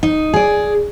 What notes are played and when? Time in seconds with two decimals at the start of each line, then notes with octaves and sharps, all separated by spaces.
0.03 D#4
0.34 G#4 D5